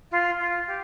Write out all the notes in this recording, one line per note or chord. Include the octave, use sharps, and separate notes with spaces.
F4
F4
G4